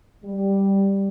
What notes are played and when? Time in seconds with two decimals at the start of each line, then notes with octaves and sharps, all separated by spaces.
0.23 G3